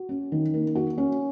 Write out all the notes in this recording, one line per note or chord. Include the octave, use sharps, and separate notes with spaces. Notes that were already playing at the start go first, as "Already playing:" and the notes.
Already playing: F#4
C#4
D#3
A#3
F#4
C#4